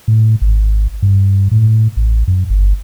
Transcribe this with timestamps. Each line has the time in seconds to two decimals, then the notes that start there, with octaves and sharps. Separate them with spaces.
0.08 A2
0.41 G#1
1.02 G2
1.51 A2
1.97 A1
2.28 F#2
2.50 G1